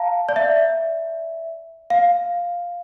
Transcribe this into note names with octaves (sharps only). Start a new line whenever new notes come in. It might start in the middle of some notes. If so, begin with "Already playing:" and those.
Already playing: F5 A5 A#5
D5
E5
F5